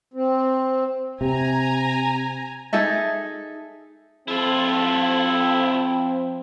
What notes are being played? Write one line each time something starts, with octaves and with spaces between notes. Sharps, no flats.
C4
C3 G#5 A#5
D#4 G#4 A4 E5
F3 C4 E4 F4 A4